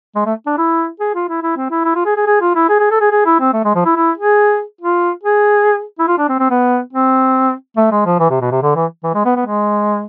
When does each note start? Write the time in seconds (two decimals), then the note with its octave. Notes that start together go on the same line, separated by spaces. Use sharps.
0.15 G#3
0.26 A3
0.47 D4
0.58 E4
1.00 G#4
1.14 F4
1.29 E4
1.42 E4
1.56 C4
1.70 E4
1.85 E4
1.95 F4
2.06 G#4
2.16 G#4
2.27 G#4
2.41 F4
2.55 E4
2.69 G#4
2.80 G#4
2.91 A4
3.01 G#4
3.12 G#4
3.26 E4
3.40 C4
3.53 A3
3.65 G#3
3.75 F3
3.85 E4
3.96 E4
4.18 G#4
4.81 F4
5.23 G#4
5.99 E4
6.08 F4
6.18 D4
6.29 C4
6.39 C4
6.50 B3
6.93 C4
7.77 A3
7.92 G#3
8.06 F3
8.19 E3
8.30 C3
8.41 B2
8.51 C3
8.62 D3
8.76 E3
9.04 E3
9.15 G#3
9.25 B3
9.36 B3
9.46 G#3